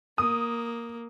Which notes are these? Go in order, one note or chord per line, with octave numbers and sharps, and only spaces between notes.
A#3 D#6